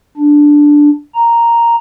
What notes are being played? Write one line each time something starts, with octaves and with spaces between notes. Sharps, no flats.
D4
A#5